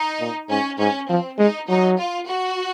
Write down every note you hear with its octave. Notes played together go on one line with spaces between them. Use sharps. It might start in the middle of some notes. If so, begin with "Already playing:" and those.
Already playing: D#4
A#2
G#2 C#4
G#2 C#4
F3 C4
G#3 D#4
F#3 D#4
F4
F#4